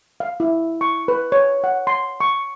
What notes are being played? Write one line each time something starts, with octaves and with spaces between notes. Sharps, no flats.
F5
E4
C#6
B4
C#5
F#5
C6
C#6